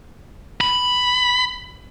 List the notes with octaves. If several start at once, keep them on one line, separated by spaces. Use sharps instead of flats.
B5